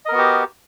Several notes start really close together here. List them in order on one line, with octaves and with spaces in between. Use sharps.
D#5 A#4 B3 F#4 G4